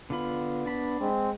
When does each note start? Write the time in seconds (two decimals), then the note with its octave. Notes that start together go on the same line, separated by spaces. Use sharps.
0.10 D3 B3 F4 B5
0.66 D4 B5
1.01 G#3 C4